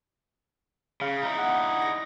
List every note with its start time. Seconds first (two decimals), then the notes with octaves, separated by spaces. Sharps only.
1.01 C#3 F5
1.23 D#4 E4
1.39 F#5
1.81 A#6